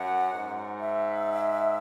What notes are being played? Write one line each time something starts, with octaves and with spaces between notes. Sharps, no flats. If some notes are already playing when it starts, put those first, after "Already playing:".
Already playing: F#2 F#5
G#2
E5